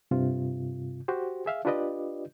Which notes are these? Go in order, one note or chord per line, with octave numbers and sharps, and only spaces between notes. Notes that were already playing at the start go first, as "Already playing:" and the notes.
G2 C3 F4
F#4 G4 C5
G#4 E5 F5
D4 F4 G4 B4 D5 D#5